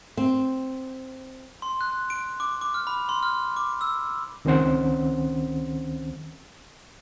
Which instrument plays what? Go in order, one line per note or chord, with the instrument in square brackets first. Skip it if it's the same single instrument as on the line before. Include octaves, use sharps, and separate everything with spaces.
[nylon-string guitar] C4
[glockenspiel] C6
F#6
D7
D6
D6
F6
B5
C6
F6
D6
E6
[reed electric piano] C#2 D#3 C4 C#4 C5 F#5